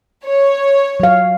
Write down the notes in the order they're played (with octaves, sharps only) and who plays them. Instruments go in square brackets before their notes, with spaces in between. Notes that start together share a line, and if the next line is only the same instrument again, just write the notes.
[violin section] C#5
[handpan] F#3 F5